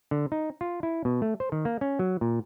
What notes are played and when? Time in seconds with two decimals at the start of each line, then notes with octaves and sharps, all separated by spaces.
0.11 D3
0.32 D#4
0.61 F4
0.83 E4
1.05 B2
1.22 A3
1.40 C5
1.52 D#3
1.65 A#3
1.81 C#4
1.99 F#3
2.21 A#2